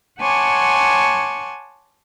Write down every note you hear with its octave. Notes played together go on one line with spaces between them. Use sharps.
C#5 F#5 G#5 A5 C6 D6